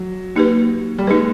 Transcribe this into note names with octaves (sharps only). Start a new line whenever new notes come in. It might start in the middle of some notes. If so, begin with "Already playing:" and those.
Already playing: F#3
A#3 D#4 G4 B4
G3
G#3 A#3 D#4 G4 B4